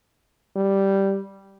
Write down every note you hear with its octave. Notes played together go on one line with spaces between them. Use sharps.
G3